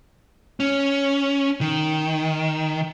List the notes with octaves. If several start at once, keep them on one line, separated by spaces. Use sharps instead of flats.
C#4
D#3